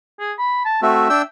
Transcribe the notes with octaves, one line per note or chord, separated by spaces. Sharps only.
G#4
B5
A5
A3 C4 F#4 E5
D4 G5 E6